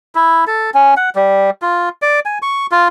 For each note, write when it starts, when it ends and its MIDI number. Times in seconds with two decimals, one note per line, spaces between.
0.15 0.45 64
0.47 0.70 69
0.74 0.94 61
0.97 1.10 78
1.15 1.50 55
1.62 1.89 65
2.02 2.20 74
2.26 2.39 80
2.42 2.67 85
2.72 2.88 65